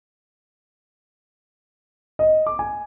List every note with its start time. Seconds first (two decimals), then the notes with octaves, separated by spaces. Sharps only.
2.19 D#5
2.46 D6
2.59 G#5